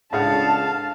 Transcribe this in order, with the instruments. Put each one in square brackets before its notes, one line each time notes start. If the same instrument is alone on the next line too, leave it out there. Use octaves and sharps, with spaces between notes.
[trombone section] C#2 D4 [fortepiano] A2 G#4 F#5 [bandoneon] F5 [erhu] A5